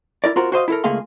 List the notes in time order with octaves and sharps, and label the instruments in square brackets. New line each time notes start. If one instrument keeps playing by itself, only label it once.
[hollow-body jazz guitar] E4 A#4 D5
F4 F#4 A#4 C5
F#4 C5 D#5 F5
E4 A4 A#4
C#2 A3 A#3 G#4 F5 C6